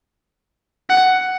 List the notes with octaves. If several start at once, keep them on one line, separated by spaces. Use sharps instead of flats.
F#5